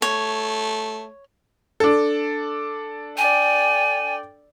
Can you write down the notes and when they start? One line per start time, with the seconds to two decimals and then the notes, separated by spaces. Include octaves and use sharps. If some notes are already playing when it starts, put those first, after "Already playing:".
0.02 A3 C#5
1.80 D4 A4
3.17 D5 G5 G#5